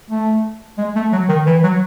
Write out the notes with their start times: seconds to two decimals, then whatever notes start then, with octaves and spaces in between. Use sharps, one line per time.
0.10 A3
0.78 G#3
0.96 A3
1.13 F#3
1.29 D#3
1.46 E3
1.63 F#3